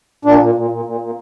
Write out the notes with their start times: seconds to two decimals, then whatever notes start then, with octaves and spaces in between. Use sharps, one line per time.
0.25 A#2 D4
0.40 A#2
0.55 A#2
0.70 A#2
0.85 A#2
1.01 A#2